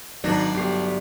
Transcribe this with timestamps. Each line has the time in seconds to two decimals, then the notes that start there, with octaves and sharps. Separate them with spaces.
0.24 G#1 F#3 D4 D#4 A#6
0.54 G1 G4 C7